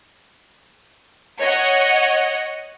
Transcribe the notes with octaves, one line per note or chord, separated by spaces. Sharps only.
C#5 D#5 F#5